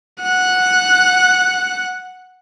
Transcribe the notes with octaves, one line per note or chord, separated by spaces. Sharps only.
F#5 F#6